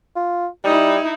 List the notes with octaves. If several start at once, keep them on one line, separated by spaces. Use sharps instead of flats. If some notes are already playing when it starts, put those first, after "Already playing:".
F4
G3 D#4 E4